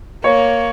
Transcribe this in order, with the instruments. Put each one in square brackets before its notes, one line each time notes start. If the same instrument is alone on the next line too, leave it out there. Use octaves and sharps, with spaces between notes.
[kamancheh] A#3 [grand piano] C#5